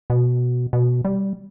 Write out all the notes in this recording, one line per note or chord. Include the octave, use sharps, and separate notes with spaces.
B2
B2
G3